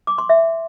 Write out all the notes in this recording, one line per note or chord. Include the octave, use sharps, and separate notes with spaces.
D6
C6
E5